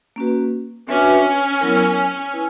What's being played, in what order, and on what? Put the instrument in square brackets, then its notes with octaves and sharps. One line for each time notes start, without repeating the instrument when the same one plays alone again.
[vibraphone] A#3 C#4 F#4 B4
[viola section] C#4 [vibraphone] D4 F#4 B4 E5
[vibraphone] F#3 B3 E4 A#4
E4 B4